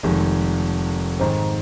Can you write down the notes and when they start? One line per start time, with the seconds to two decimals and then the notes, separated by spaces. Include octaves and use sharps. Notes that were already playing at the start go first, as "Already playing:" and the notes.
0.03 F1 F2 D#3 G#3
1.20 G#2 D#3 C4